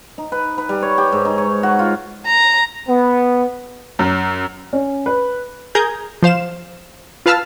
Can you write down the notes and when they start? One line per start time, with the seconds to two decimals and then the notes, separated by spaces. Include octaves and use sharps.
0.18 D#4
0.32 B4
0.58 B4
0.69 G3
0.82 C#5
0.98 G4
1.12 G#2
1.25 D#4
1.38 C#5
1.63 F#4
1.79 F4
2.26 A#5
2.88 B3
3.99 F#2
4.73 C#4
5.06 B4
5.75 G#4 A#4 A#5 D#6 G6 G#6
6.23 F3 C5 F5 E7
7.26 F4 B4 F5 A5 E6 F6